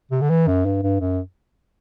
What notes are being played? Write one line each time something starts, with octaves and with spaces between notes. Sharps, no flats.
C3
D3
E3
F#2
G2
G2
F#2